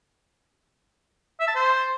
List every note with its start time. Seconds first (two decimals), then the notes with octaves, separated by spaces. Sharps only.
1.40 E5
1.48 A5
1.55 C5